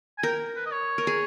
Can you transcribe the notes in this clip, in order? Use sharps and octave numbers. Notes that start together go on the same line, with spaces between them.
G#5
A#4 G5
B4
D#5
C#5
A#4
G#4